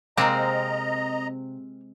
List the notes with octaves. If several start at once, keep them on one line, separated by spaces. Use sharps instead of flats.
C3 G#3 A#3 C4 A#4 D#5 A#5